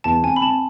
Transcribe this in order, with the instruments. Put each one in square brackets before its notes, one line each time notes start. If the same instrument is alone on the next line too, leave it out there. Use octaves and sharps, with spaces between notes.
[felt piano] E2 [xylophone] A5
[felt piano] C4 [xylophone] G#5
[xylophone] B5
[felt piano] C4 [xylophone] A5